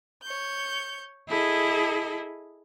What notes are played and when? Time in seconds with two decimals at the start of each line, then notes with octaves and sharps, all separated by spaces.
0.22 C#5 G6
1.28 E4 G#4 A4 D#5